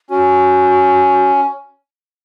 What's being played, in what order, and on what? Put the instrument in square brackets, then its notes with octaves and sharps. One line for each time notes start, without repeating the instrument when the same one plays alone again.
[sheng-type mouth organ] C#4 [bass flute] F#4